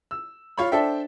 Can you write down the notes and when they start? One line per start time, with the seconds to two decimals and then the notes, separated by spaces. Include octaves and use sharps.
0.11 E6
0.57 F4 C#5 B5
0.72 D4 A4 C5 E5 G5